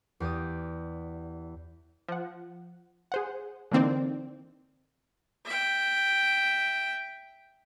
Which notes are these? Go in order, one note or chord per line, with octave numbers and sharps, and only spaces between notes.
E2 G4 D5 D#6
F3 F#5
G#4 C5 F#5
D3 E3 A#3 C4 D#4 D5
E5 G5